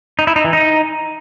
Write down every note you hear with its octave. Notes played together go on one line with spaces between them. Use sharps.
D#4
E4
D#4
E3
D#4